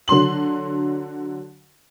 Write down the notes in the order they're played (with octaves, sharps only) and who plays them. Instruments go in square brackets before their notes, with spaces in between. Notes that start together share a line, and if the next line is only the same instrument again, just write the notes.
[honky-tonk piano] D3 F#3 C6 F#7